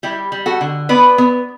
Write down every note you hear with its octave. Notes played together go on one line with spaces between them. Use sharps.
G3 E4 G4
G3
F#4 A4
D3
B3 B4 D5
B3